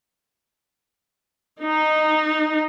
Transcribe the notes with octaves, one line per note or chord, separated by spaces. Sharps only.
D#4